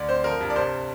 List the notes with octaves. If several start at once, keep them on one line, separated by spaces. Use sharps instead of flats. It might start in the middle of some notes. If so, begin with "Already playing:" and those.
Already playing: D2 D5
C4 C5
F3 A#4
G2
D5
C2 C5